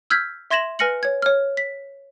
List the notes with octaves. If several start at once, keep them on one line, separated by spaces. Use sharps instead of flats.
E6 F6 G6 G#6 B6
E5 C6 G#6 A#6 E7 F#7
B4 G#5 F6 A#6 C#7 F#7
C#5 G#6
C#5 F6
B6